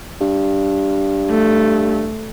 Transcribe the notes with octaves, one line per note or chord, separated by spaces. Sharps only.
G2
A3